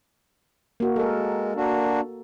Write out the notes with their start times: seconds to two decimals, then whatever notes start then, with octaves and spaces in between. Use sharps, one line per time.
0.80 A#3 F#4
0.96 G#3 A4 A#4
1.56 A#3 D4 F#4